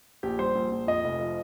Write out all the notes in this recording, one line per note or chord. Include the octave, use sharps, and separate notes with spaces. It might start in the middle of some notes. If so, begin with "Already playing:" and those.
A#1 G4
G3 C5
A#1
A#1
F2 D#5
F1
F3